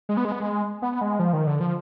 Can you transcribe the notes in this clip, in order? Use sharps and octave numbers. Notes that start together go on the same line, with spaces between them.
G#3
B3
G#3
B3
G#3
B3
G#3
F3
D#3
D3
F3